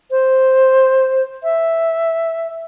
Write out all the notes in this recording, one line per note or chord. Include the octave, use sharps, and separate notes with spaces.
C5
E5